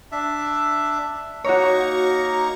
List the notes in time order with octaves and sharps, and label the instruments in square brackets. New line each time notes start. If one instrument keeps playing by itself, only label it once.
[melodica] D4 E5
[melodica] A#3 D#4 A#5 [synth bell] F#4 C#5